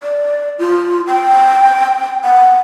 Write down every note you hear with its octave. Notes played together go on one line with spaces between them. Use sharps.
D5
F4
G5
F#5